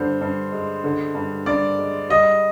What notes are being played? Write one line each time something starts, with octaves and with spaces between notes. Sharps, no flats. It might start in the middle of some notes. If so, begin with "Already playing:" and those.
Already playing: G2 D3 C5
G2
G#3
D3
G2
G2 D5
G#3
G3 D#5